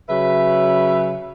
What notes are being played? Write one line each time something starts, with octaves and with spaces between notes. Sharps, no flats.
C#3 F#3 B4 E5